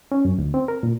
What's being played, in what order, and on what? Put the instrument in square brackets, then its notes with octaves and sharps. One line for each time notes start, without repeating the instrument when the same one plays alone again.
[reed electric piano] C#4
F#2
D2
C4
A#4
A#2